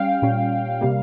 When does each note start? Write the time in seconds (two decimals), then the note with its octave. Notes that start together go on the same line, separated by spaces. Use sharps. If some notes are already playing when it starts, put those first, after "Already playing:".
Already playing: G3 C#4 F5 G5
0.22 A#2 G3 C#4
0.81 C3 G3 A#3